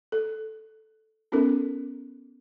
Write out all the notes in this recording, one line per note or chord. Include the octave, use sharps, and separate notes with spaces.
A4
B3 C#4 D#4 F4 A4 A#4